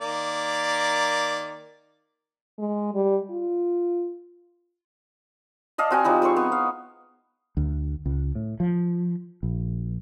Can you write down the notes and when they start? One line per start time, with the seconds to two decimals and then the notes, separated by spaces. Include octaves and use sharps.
0.01 D#3 A#3 D5
2.59 G#3
2.94 G3
3.30 F4
5.78 D5 D#5 F5 A5
5.91 C4 F#4 G#5
6.04 F3 G3 D#4 E4
6.22 G#3 C4 C5 C#6
6.36 B3
6.52 F5
7.57 D2
8.06 C#2
8.35 A2
8.60 F3
9.43 A#1